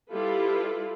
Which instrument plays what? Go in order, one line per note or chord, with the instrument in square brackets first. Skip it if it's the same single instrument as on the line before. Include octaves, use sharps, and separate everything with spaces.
[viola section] G3 E4 F4 G4 A4 B4